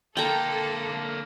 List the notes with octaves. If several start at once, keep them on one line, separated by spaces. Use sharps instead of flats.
D3 A#3 A4 G5 A#5